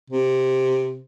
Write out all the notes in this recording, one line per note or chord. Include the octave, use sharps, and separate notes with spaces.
C3